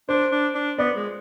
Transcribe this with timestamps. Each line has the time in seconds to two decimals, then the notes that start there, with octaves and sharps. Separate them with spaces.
0.09 D4 C5
0.31 D4
0.55 D4
0.78 B3 D5
0.96 G#3